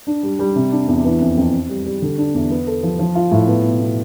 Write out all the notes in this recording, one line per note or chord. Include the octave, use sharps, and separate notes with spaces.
D4
G3
G3
C3
D4
E2
E3
F2
F2
C4
G3
G3
D3
D4
E2
B3
A4
F3
F3
F4
A2
B3
B2
B2